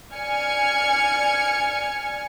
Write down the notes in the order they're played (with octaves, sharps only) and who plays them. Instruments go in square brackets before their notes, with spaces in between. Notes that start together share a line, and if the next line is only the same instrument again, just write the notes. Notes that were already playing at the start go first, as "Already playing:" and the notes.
[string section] D5 G#5 F6 G#6 C#7